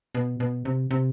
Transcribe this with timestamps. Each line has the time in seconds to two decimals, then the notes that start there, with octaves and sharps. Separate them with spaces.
0.15 B2
0.40 B2
0.65 C3
0.91 C3